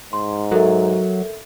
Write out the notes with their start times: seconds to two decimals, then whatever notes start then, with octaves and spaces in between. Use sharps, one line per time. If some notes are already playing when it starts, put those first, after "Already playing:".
0.13 G#2 C6
0.52 F#3 A4 A#4 E5